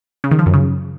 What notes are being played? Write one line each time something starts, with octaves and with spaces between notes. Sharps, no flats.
C#3
D#3
F3
F#2
C#3